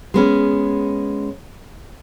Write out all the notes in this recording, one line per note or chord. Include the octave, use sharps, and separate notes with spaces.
G#3 B3 C#4